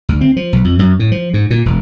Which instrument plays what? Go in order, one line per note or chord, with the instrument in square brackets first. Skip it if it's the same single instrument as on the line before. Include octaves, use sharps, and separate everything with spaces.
[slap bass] D2
C4
F3
B1
F2
F#2
A2
F3
G#2
A#2
E1